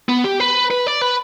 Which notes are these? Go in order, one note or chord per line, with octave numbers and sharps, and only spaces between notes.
B3
G4
B4
B4
D5
B4